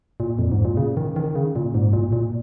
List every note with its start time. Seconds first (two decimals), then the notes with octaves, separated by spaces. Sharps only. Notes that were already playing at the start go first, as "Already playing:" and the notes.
0.20 A#2
0.39 F2
0.52 G#2
0.65 A#2
0.77 C#3
0.97 D#3
1.16 D#3
1.35 C#3
1.56 A#2
1.74 G#2
1.93 A#2
2.12 A#2